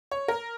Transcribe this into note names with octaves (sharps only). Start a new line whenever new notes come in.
C#5
A#4